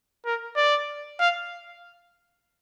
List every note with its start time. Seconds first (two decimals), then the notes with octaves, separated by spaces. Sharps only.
0.26 A#4
0.56 D5
1.20 F5